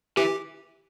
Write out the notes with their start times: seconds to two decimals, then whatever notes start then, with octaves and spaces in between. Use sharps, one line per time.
0.17 E3 G4